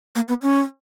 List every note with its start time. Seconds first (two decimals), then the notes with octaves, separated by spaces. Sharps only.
0.15 A#3
0.28 B3
0.42 C#4